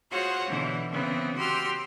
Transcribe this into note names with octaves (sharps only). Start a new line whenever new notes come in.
F4 F#4 G#4 C5 C#5 F#5
B2 D3 E3
C#3 E3 B3 C4
F#4 G4 C6 E6 F6